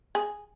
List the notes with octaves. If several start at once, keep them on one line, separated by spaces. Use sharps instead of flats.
G#4